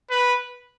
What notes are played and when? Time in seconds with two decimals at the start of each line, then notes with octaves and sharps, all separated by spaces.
0.10 B4